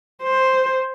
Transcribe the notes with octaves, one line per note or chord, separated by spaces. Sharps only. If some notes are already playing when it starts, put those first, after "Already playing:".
C5